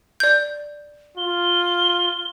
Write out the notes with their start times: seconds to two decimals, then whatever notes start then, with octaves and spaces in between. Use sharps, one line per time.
0.20 D5 G6
1.18 F4 G7